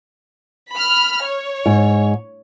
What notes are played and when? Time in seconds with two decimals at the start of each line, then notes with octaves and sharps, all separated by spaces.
0.73 B5 F6
1.25 C#5
1.66 G#2